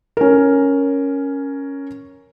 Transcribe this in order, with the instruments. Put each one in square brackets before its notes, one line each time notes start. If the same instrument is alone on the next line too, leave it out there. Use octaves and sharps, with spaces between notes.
[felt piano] C#4 A#4